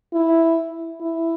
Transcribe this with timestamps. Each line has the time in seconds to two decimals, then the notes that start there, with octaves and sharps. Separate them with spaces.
0.14 E4
1.01 E4